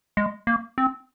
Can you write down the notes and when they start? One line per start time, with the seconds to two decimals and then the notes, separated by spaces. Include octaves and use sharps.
0.17 G#3
0.47 A#3
0.78 C4